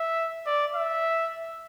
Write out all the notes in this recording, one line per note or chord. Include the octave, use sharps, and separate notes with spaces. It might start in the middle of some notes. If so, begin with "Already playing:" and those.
Already playing: E5
D5
E5